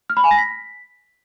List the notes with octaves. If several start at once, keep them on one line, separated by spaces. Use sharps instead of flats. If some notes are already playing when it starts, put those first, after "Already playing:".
F6
B5
G#5
A#6
B6